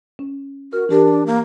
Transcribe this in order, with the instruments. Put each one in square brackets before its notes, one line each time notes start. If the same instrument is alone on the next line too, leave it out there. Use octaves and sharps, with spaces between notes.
[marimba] C#4
[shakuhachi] F#4 [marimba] A#4 F6
[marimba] E3 G4 A#4 [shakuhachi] D4
[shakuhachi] A#3